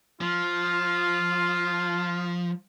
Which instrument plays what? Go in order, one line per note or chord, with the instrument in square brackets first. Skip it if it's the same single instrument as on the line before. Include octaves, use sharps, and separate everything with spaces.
[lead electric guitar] F3 [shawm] F4